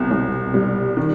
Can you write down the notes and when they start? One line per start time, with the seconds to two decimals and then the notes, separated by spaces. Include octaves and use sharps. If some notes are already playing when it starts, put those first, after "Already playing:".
Already playing: C2 B2
0.11 C2
0.54 G3
0.97 D#3